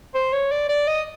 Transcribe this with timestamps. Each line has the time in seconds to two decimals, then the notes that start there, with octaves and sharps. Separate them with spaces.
0.15 C5
0.33 C#5
0.52 D5
0.69 D5
0.88 D#5